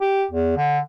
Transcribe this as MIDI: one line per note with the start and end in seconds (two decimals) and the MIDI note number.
0.01 0.25 67
0.31 0.56 40
0.57 0.79 50